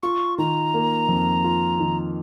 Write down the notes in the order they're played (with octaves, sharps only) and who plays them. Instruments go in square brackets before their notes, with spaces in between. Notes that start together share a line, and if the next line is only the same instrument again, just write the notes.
[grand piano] F4 [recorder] C#6
[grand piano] D#3 [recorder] A#5
[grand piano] A#3
F2
F4
D#3